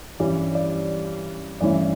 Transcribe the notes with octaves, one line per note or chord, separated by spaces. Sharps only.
G2 E3 G3 C#4 D5
D5
G2 E3 A3 C#4 E4 D5